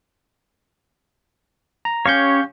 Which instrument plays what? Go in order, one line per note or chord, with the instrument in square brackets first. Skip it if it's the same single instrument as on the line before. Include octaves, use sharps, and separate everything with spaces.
[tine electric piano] A#5
[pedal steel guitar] C#4 G4 C#5 [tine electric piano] F5 C#6 G6